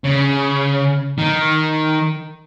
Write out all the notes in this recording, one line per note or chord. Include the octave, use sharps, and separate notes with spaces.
C#3
D#3